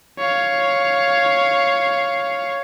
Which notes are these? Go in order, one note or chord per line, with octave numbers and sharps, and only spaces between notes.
C#5 F5